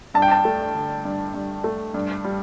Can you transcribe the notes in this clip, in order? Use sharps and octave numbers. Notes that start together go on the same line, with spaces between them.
G2 A5
G5
A5
A3
D3
G2
G2
A3
G2
G3